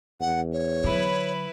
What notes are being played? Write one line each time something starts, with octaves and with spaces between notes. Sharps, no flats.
E2 F#5
C#5
D3 F#3 E4 B4